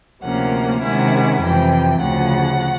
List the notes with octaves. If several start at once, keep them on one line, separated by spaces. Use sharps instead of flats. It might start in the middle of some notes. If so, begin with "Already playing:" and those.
D2 C3 F3 A#3 C#4 F#5
C3 D#3 G#3 C#4 E4 F#5
F2 C3 E3 G5
D2 C#3 F3 F#5